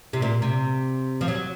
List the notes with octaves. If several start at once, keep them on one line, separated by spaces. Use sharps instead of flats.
C3
A#2
C3
F3
F#3